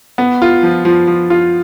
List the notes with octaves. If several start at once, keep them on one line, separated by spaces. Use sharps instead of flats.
B3
F4
F3
F3
F3
F4